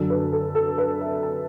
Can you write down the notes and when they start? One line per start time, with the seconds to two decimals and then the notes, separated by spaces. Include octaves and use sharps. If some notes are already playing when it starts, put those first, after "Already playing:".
Already playing: F#2 D3 F#3 D4 A4
0.10 B4
0.33 A4
0.55 A4
0.78 B4
1.01 E5
1.23 A5